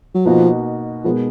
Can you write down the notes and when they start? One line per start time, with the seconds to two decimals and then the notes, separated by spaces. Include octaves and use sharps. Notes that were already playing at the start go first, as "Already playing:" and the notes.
0.14 F#3
0.25 B2 F3 A#3 D#4 F#4
1.04 B2 F3 G#3 B3 D#4 A#4